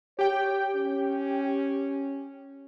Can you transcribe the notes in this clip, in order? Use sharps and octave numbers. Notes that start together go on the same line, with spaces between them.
G4 C#5 G5
C#4